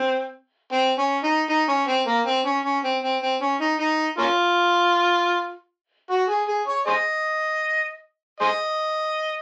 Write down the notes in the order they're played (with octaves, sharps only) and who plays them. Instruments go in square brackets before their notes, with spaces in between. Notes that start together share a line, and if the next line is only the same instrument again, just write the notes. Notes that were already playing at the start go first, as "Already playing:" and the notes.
Already playing: [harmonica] C4
C4
C#4
D#4
D#4
C#4
C4
A#3
C4
C#4
C#4
C4
C4
C4
C#4
D#4
D#4
A#3 C#4 F4
F#4
G#4
G#4
C#5
G#4 C5 D#5
G#4 C5 D#5